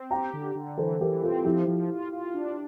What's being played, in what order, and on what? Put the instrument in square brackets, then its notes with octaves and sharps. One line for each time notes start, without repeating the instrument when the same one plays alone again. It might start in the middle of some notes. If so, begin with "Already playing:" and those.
Already playing: [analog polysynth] C4
[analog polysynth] G4 [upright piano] G5 A#5
[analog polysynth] D3
D3
[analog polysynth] E3 [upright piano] A4 C5
[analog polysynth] E3 [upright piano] G4 A#4
[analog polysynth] C4 [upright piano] F4 A4
[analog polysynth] F3 [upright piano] E4 G4
[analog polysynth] F3
F4
F4
D4